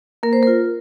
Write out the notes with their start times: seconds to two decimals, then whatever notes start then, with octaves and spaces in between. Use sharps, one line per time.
0.23 A#3 A#4
0.33 C5
0.43 A#4
0.47 F4